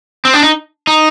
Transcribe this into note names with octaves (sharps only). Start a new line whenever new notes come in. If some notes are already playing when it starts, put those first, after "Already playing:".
C4
D4
D#4
D#4